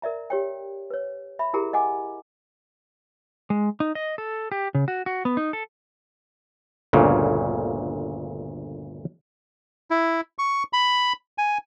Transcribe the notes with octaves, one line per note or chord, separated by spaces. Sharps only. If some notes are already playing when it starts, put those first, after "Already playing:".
A#4 D5 E5 A#5
G4 C#5 G5
B4 C#5
E5 B5
E4 G4 G#4 A#4 A#5
D#5 F#5 G#5 D6
G#3
D#4
D#5
A4
G4
C#3
F#4
F#4
B3
D#4
A4
G1 D2 A#2 C#3
E4
C#6
B5
G#5